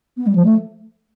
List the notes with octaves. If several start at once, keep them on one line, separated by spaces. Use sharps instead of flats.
B3
G3
F3
A3